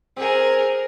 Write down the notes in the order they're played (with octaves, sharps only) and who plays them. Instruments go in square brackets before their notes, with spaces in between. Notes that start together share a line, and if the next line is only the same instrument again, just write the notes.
[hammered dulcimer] C4 [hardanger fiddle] G#4 A#4